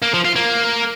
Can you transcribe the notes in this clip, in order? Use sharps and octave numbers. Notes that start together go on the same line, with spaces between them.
A#3
F3
F4
A#3